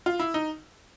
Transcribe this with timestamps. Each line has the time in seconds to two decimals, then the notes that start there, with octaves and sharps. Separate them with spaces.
0.06 F4
0.20 E4
0.34 D#4